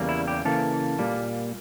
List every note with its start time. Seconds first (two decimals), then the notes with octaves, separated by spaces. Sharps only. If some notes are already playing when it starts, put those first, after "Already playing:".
Already playing: E2 C#3 G3 A#3
0.09 E4
0.28 G4
0.45 C#3 E3 A#3 A4
0.99 A#2 G3 A#3